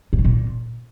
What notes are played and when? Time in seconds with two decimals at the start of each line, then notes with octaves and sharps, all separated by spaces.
0.13 G2
0.19 B2
0.24 A#2